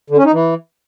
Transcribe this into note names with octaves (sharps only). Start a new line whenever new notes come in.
D3
C#4
D#4
E3